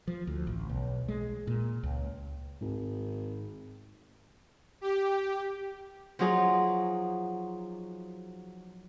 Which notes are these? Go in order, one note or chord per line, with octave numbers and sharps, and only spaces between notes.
F3
D2
A1
B1
G#3
A#2
C#2
G#1 G#2
G4
F3 F#3 D#4 G#4